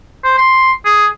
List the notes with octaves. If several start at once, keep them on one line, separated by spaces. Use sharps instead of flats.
C5
C6
G#4